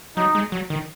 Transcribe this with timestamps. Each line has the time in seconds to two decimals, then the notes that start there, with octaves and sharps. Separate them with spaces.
0.17 F#3 D#4
0.35 G#3
0.52 F#3
0.70 D#3